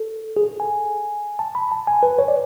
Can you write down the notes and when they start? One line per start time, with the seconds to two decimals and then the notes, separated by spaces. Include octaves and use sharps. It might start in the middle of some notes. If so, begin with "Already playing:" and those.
Already playing: A4
0.37 G#4
0.44 A4
0.60 G#5
1.39 A5
1.55 B5
1.72 A5
1.87 G#5
2.03 B4
2.19 C#5
2.28 D5